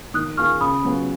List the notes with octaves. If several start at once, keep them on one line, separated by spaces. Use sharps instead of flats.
D#3 D#6 F#6
A#3 F4 G#4 C#6 F6
C#3 B5 D#6
F#3 B3 F4 G#4